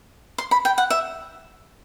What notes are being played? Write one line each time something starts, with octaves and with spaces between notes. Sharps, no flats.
C6
B5
G5
F#5
E5